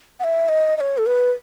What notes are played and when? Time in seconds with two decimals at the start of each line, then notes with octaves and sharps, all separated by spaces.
0.20 F#5
0.24 E5
0.49 D#5
0.77 D#5
0.80 C#5
0.98 A4
1.06 B4